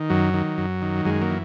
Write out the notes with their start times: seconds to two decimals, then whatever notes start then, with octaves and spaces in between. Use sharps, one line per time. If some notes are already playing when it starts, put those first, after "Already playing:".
Already playing: D#3
0.10 F#2 F#3
0.34 D#3
0.58 F#2
0.82 D#3
1.05 F#2 G#3
1.21 F#3 A#3
1.30 E3